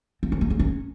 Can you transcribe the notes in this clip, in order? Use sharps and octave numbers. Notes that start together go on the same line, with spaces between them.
C4
F3
A#3
F#3
C#4